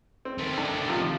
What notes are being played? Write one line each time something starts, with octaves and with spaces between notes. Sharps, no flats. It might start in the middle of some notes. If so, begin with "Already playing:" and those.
C4
D#3 A3
D4
C3 F3